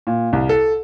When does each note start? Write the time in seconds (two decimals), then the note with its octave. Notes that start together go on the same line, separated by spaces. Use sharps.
0.07 A#2
0.33 C2
0.49 A4